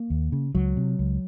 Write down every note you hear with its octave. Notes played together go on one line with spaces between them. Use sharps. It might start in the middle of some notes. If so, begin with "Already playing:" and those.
Already playing: A#3
D#2
C#3
C#2 F#3
C3
C#2